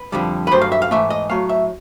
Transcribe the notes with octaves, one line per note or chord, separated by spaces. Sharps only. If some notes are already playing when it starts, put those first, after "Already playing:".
Already playing: B4
F2 D3 G3
B4
G2 D#3 F#3 A3 C5
F5
E5
F5
G#2 E3 A3 E5
D#5
A2 F#3 A3 F5
E5